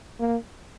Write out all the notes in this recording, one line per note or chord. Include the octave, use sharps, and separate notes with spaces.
A#3